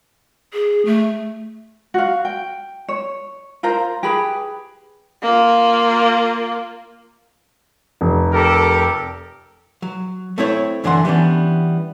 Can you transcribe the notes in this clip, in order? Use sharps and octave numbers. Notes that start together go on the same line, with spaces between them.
G#4
A3
F#4 F5
G5
C#5
F4 A#4 C5 A#5
G4 G#4 B4 B5
A#3 F4
F1
G4 A4 A#4
F#3
A3 C4 E4 C#5
F#2 D3 E3 D4 F#5 C6
E3 G3 B3 C#4 D4